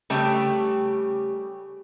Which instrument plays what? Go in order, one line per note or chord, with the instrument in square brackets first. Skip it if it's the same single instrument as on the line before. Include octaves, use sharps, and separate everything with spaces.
[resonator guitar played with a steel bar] C#3 G3 A3 G4 D5